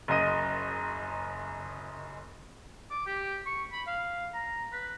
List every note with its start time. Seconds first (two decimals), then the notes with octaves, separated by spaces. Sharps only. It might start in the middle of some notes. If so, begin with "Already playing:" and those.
0.08 F#1 F#2 D#5 D#7
2.91 D6
3.06 G4
3.46 C#6
3.72 B5
3.87 F5
4.34 A#5
4.73 B4